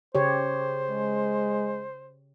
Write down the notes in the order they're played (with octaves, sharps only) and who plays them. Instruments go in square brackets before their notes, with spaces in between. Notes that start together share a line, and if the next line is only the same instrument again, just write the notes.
[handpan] C#3 G4 C#5 [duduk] C5
[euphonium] G#3